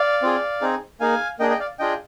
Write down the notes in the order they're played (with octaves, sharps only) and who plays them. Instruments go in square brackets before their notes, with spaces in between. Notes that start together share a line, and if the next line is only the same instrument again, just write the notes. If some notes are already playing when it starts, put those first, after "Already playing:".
Already playing: [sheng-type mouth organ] D5 F5
C4 F4 G#4
C4 D#4 G#4
A#3 D#4 G#4 F5 G#5
A#3 D4 G#4 D#5 G5
D#5 G5
D5 F5
D4 F4 G#4 D#5 G5